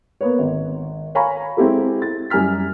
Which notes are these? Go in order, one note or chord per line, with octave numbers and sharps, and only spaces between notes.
A#3 B3 B4 C#5
G#1
C#5 F5 G#5 A#5 B5 C#6
G#3 C4 E4 G4 A4
A6
F#2 G3 G#5 A#5 F6 B6